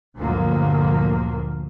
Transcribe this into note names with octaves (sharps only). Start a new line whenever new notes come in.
G1 D2 A#2 F3 F#3 A#3